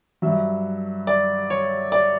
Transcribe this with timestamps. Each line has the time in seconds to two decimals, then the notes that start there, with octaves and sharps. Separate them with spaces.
0.22 G2 F#3 E5
1.07 D5
1.50 C#5
1.92 D5